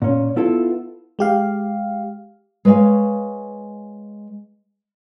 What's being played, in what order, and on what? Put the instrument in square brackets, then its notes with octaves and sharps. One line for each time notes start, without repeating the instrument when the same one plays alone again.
[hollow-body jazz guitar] A#2 C#4
B3 E4 F4 A4
[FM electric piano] G#3 G4 F5
[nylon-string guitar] G#3 B4 C#5 D5 F5 G#5